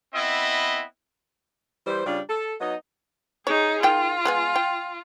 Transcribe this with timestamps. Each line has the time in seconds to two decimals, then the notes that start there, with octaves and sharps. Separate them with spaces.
0.14 B3 C4 E4 D#5
1.87 E3 G3 C5
2.06 C#3 G3 D4 F4 G4
2.30 A4
2.61 F#3 B3 D#4 D#5
3.47 D#4 G#4 C#5
3.83 D#3 F4 G5
4.25 G#3 B3 G#5
4.56 G5